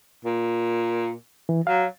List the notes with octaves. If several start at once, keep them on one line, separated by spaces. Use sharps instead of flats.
A#2
E3
F#3 F5